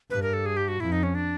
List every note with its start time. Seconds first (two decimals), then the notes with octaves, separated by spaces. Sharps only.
0.10 G2 B4
0.22 A#4
0.33 A4
0.46 G#4
0.57 G4
0.68 F#4
0.80 F2 E4
0.92 D#4
1.03 C#4
1.15 D4